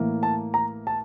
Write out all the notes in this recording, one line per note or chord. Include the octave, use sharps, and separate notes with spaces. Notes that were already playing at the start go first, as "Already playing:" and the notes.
Already playing: A2 E3 A#3
A5
A#5
A5